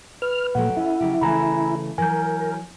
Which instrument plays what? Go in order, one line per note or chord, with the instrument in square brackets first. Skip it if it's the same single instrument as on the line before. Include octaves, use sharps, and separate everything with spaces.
[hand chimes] B4 [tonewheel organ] F6
[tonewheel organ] A#2 [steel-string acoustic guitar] F#3 A3 G4 [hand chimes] F#5
[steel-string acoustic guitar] C#4 [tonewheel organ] E4
[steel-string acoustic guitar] C#3 F#3 G4
[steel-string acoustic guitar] C#3 E3 A3 [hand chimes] G#5 A#5 B5
[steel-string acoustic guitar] E3 F#3 [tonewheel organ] A#4 [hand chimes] G#5 G6